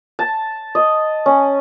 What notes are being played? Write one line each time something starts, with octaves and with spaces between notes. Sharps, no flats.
A5
D#5
C#4